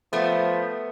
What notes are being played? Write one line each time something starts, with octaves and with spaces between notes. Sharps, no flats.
F3 A3 B3